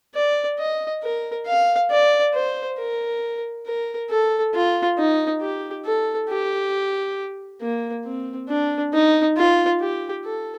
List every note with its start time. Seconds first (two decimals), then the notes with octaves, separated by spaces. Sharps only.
0.15 D5
0.59 D#5
1.03 A#4
1.46 F5
1.91 D5
2.34 C5
2.79 A#4
3.66 A#4
4.10 A4
4.54 F4
4.98 D#4
5.41 G4
5.86 A4
6.29 G4
7.61 A#3
8.05 C4
8.49 D4
8.93 D#4
9.37 F4
9.81 G4
10.25 A4